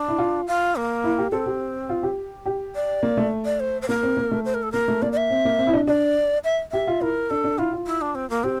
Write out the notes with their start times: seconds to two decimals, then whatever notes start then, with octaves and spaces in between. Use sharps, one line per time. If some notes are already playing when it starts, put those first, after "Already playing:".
Already playing: D4
0.08 E4
0.18 F4
0.47 F4
0.76 A#3
1.04 E4
1.18 G4
1.32 C4 A4
1.46 G4
1.89 F4
2.03 G4
2.46 G4
2.75 D5
3.03 A#3
3.17 A3
3.45 D5
3.60 C5
3.82 C5
3.89 A#3 A#4
4.03 C4
4.17 A#3
4.31 A3
4.45 C5
4.54 A#4
4.63 A4
4.72 A#3 A#4
4.88 A3
5.02 A#3 D5
5.12 D5
5.17 E5
5.30 C4
5.45 A#3
5.59 C4
5.67 E4
5.73 D4
5.87 D4 D5
6.44 E5
6.71 G4 E5
6.87 F4
7.01 E4 A#4
7.30 D4 A4
7.44 D4
7.58 E4 F4
7.73 F4
7.86 E4
8.01 D4
8.15 C4
8.30 A#3
8.44 C4 G4